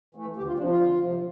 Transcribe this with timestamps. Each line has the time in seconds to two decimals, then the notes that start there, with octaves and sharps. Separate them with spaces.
0.15 E3 A3
0.36 D2 G4
0.47 F4
0.58 C3 F3 D4
0.69 F4
0.80 D2
1.01 C3 F3